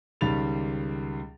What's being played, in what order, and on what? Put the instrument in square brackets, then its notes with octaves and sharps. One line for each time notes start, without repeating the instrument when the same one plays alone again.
[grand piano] C#2 D#3 G3 B5 A6 F7